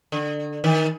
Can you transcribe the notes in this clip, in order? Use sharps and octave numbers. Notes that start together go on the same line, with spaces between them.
D3
D#3